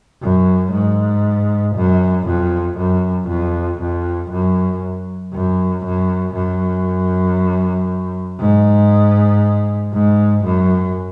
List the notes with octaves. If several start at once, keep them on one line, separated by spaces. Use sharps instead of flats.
F#2
G#2
F#2
F2
F#2
F2
F2
F#2
F#2
F#2
F#2
G#2
G#2
F#2